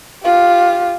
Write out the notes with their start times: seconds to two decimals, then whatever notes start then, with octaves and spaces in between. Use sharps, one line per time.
0.24 F4 G4